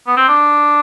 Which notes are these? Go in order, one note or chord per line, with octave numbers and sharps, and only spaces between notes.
B3
C4
D4